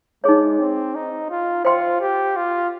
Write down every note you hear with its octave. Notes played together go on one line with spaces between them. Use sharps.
G#3 D#4 G#4 C#5
C4
D#4
F4
F4 C5 G5 C6
G4
F4